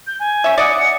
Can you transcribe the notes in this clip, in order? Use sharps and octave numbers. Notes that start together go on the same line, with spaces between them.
G6
G#5
C#4 E5
D5 D#5 F#5 C#7